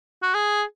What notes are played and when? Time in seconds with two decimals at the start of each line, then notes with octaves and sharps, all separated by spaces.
0.23 F#4
0.34 G#4